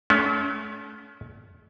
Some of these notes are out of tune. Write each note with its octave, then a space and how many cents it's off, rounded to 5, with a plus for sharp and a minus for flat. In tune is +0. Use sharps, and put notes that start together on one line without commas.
A3 -35 C#4 +25